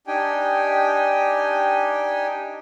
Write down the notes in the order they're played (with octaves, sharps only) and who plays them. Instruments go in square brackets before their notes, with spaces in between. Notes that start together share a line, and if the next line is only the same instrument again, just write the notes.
[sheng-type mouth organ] D4 D#4 G4 G5 G#5